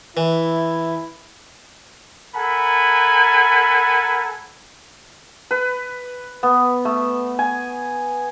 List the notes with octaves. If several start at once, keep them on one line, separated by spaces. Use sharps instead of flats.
E3 E4
A4 A#4 F#5 G#5 A#5 B5
B4
B3
A3
G#5